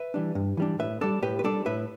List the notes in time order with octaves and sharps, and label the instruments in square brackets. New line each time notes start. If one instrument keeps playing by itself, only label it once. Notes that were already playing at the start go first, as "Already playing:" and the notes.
Already playing: [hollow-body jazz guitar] B4 E5
E3 G3 D4
G2
E3 G3 D4
A2 B4 E5
G3 D4 A4 D5
A2 G4 B4
B4
G3 D4 A4 D5
A2 B4 E5